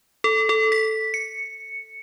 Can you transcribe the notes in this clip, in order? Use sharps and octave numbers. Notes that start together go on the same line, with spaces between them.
A4
A4
B6
C#7